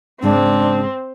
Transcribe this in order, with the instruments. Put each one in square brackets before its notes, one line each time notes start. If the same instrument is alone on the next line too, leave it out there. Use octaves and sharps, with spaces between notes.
[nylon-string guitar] G#2 C#3 G#3 [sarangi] C4 [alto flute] D4